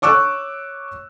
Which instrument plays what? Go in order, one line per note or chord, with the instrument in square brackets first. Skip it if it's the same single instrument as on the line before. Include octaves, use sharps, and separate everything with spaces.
[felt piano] C#5 C#6 D6 E6 F#6